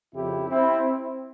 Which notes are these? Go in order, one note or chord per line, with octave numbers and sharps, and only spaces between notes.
F2 C#3 F3 C4 E4 G4
C4 E4